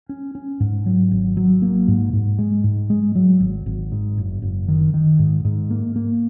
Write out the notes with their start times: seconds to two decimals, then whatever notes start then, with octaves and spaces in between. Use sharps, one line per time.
0.09 C#4
0.35 C#4
0.60 G#2
0.86 F#3
1.11 G#1
1.37 F#3
1.62 A#3
1.88 G#2
2.13 G#2
2.38 G#3
2.64 G#2
2.90 G#3
3.15 F#3
3.40 G#1
3.66 G#1
3.92 G#2
4.18 F#1
4.42 F#1
4.68 D#3
4.94 D#3
5.19 G#2
5.45 G#2
5.70 A#3
5.96 A#3